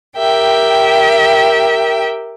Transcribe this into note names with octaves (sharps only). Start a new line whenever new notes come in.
G4 A#4 E5 G5